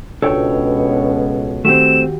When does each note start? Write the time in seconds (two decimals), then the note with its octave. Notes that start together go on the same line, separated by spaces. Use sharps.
0.22 C#2 B2 D4 A4 C#5 G5
1.65 D#3 A3 C4 F#4 G4 E7